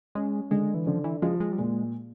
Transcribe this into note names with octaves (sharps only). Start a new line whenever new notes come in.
G#3 C#4
D3 G#3
E3
D3 F3
E3
F3 G#3
G#3
G3
A#2 G#3